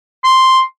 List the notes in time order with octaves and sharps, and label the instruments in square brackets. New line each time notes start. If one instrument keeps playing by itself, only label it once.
[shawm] C6